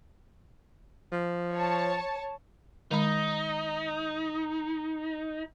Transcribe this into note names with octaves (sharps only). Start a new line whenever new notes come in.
F3
C#5 A5
D#3 G#3 D#4 B5